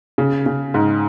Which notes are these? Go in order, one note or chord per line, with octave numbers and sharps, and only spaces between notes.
C#3
C#3
G#2